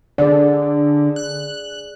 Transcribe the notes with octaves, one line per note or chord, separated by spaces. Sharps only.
D3 G#4 D5
F#6